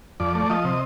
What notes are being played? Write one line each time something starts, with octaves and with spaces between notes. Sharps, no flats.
F2 D5
A3
F3 D#5
C3